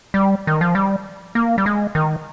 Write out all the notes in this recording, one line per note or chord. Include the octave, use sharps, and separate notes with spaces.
G3
D#3
F3
G3
A#3
G3
G#3
D#3